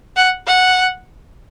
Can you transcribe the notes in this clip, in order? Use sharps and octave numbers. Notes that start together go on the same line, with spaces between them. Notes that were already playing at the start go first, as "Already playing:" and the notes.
F#5
F#5